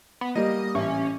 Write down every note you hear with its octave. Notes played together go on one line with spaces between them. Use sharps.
B3
G3 A#3 D#5
A1 C#4